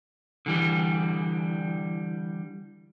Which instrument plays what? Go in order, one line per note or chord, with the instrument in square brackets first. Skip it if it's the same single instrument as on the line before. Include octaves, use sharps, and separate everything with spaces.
[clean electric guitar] D3 E3 G3